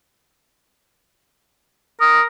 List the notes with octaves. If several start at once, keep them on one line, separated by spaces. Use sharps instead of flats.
A#4 D#6